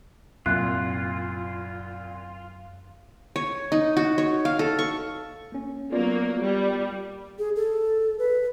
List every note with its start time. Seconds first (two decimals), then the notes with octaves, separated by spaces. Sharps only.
0.46 C2 F#2 A#2 F4 F#6
3.36 C#5
3.72 D#4
3.97 F#4
4.18 C#5
4.45 F5
4.59 A4
4.79 C#6
5.52 A#3 C#4
5.92 F#3 A#3 B3 F4 D5
6.39 G3
7.39 G#4
7.56 A4
8.19 B4